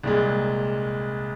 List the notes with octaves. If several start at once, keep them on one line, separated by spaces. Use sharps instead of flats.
C2 A#2 G#3